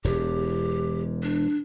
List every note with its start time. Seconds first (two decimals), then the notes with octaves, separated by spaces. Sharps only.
0.05 E1 E2 G4
1.23 D4